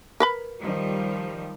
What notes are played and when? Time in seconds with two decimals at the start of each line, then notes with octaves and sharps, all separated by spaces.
0.20 A#4 B4 B5
0.61 D#3 F3 G3